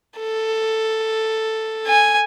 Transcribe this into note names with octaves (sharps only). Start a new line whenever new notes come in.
A4
G#5